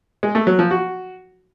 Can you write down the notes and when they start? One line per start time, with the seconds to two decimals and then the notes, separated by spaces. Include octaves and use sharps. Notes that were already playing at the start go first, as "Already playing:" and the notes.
0.23 G#3
0.35 A3
0.47 F#3
0.59 F3
0.71 F#4